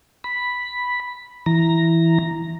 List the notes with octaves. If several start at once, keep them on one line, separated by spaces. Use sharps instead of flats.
B5
E3 A#5